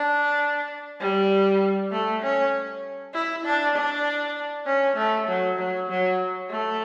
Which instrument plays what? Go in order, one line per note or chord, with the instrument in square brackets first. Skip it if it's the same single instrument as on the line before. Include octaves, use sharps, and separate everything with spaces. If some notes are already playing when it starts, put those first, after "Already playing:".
Already playing: [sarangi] D4
G3
A3
C#4
E4
D4
D4
C#4
A3
F#3
F#3
F#3
A3